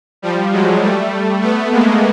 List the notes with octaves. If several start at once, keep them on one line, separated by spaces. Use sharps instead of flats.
F3 G3
F#3 G#3
G3 A3
A3 B3
G#3 A#3